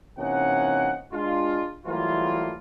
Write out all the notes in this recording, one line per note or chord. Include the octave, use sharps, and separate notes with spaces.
C3 E3 A#3 C#4 D#4 F#5
G#3 D4 F4
E3 F#3 G3 A3 A#3 F4